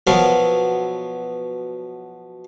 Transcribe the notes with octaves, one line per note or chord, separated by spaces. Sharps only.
B2 F3 F#3 B3 A#4